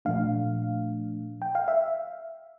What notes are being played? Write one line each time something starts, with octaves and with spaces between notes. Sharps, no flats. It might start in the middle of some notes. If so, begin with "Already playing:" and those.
A#2 F3 A3 D4 F5
G5
F5
E5